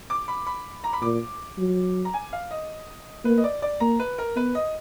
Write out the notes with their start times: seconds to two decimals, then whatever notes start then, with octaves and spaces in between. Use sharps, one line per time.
0.10 D6
0.28 B5
0.47 B5
0.84 A#5
0.93 B5
1.02 A#2 D6
1.58 F#3
2.05 A#5
2.14 G#5
2.33 F5
2.51 D#5
3.25 A#3 B4
3.38 D#5
3.44 D5
3.62 D5
3.80 A#3 A#5
3.99 B4
4.18 A#4
4.36 B3 B4
4.55 D#5